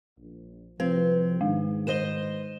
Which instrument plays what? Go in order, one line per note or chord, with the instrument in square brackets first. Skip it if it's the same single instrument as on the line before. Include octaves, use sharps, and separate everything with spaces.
[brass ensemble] A#1
[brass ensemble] C2 F3 [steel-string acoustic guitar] C4 [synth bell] B4
[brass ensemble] G#2 D#3 [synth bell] G#3
[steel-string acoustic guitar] B4 C5 D#5 [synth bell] E7 G7